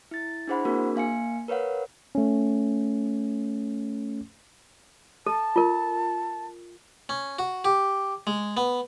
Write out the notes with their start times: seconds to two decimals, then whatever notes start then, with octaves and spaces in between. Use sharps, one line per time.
0.11 E4 A6
0.47 D4 E4 G#4 C5 F#5 B5
0.65 A#3 C4 D4 F#4 G#4 A#4
0.96 A#3 F5 G#5 C#7
1.48 A#4 B4 C#5 F5 F#5
2.15 A3 C#4
5.26 A4 A5
5.56 F4 A#4
7.09 C#4
7.39 F#4
7.65 G4
8.27 G#3
8.57 B3